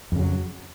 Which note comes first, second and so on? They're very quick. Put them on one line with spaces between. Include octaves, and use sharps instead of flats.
F2 C#3 F#3